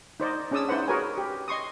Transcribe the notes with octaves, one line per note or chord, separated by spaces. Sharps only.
D#4 C5 D5 D#5
C#4 D4 G#4 D5 D#6 E6
D#4 E4 B4 C5 F#5
F#4 G#4 A#4 B4 C#5 G#5
G4
D#5 C6 C#6 D#6